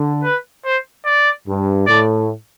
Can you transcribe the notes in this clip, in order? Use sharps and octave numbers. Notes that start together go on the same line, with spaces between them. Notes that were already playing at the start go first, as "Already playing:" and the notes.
Already playing: D3
B4
C5
D5
G2
A2 D5